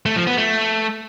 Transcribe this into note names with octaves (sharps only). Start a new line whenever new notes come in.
A3
F3
B3
A3